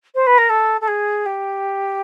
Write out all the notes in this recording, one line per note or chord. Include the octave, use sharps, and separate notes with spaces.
C5
B4
A#4
A4
A4
G#4
G4